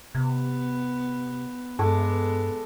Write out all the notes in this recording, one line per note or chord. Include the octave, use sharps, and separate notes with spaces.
C3 B3
G2 G#3 B3 A4 D6